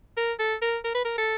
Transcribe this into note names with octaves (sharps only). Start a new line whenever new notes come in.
A#4
A4
A#4
A#4
B4
A#4
A4